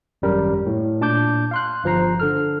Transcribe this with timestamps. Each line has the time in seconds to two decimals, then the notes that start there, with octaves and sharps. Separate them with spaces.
0.22 G#1 F#2 G3 A#4
0.66 A2
1.01 A#2 D4 A5 D6 G6
1.51 F5 C6 F#6
1.84 G1 F3 C5 A#5 C7
2.20 D3 A4 F6